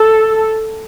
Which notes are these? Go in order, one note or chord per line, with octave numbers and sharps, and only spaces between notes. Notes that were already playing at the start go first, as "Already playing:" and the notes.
Already playing: A4